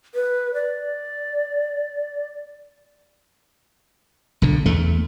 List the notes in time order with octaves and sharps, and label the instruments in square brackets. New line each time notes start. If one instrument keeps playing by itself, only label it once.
[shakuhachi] B4
D5
[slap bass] B1 D3
E2 A3